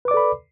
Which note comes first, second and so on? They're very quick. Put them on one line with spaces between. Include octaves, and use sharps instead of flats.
B4 D6 D5 A4 B5